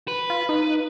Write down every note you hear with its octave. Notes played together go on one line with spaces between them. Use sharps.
B4
F4
D#4